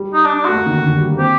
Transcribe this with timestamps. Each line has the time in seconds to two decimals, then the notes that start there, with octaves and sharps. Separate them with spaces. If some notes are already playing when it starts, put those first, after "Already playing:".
Already playing: G3
0.14 D#4
0.25 D4
0.35 D4
0.45 A3 F#4
0.55 A#3
0.66 D#3
0.77 D3
0.87 D#3
0.97 G3
1.08 A#3
1.18 C4 G4